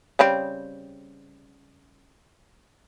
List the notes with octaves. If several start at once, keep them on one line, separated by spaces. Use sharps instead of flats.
C#3 G3 C4